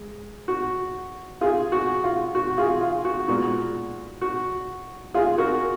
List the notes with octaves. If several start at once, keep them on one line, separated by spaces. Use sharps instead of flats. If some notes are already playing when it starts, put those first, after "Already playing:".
Already playing: G#3
F#4
F4 G#4
F#4
F4
F#4
F4 G#4
F4
F#4
A#2 G#3 B3 F#4
F#4
F4 G#4
F#4 A#4